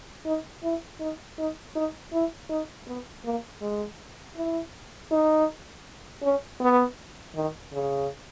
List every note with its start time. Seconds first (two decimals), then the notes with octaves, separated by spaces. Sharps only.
0.26 D#4
0.63 E4
1.00 D#4
1.38 D#4
1.76 D#4
2.13 E4
2.49 D#4
2.87 B3
3.25 A#3
3.61 G#3
4.36 E4
5.12 D#4
6.23 C#4
6.61 B3
7.35 D#3
7.73 C#3